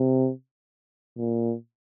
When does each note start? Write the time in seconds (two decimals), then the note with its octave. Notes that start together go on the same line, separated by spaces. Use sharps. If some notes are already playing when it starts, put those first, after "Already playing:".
Already playing: C3
1.18 A#2